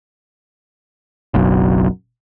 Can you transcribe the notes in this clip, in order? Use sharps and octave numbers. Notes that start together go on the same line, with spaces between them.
F#1 B1 F#2